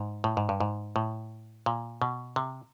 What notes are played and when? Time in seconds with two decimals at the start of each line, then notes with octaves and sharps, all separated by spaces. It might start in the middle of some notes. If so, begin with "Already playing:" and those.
Already playing: G#2
0.24 A2
0.37 G#2
0.49 G2
0.60 G#2
0.96 A2
1.66 A#2
2.02 B2
2.36 C3